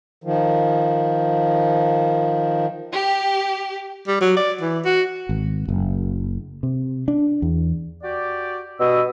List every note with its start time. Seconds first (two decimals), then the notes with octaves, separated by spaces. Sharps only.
0.24 D#3 F3
2.92 G4
4.08 G3
4.21 F#3
4.37 D5
4.61 E3
4.85 F#4
5.29 G#1
5.69 F#1
6.63 C3
7.08 D4
7.42 E2
8.03 F#4 G4 D5
8.80 G2 B2 D#6 E6